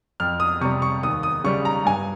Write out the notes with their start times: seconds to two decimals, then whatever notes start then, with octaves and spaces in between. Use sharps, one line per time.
0.20 F2 F6
0.40 D#6
0.61 C3 G3 C#6
0.82 C#6
1.03 D#2 D#6
1.23 D#6
1.44 C#3 G3 C#6
1.65 A#5
1.86 G2 G#5